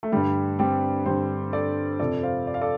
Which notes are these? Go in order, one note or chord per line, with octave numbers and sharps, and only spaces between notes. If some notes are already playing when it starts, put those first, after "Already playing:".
A3
G2 D3 G3
G3 C4
G2 D3 G4 C5
A4 D5
F2 C3 A4 D5
C5 F5
D5
F5
A4 D5